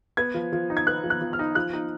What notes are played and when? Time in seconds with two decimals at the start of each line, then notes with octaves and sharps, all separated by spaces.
0.17 B3 G#6
0.34 F3
0.53 F3
0.70 D#4
0.77 G#6
0.87 B3 F#6
1.04 F3
1.10 F#6
1.21 F3
1.33 F6
1.39 D#4
1.55 F3 F#6
1.73 D#4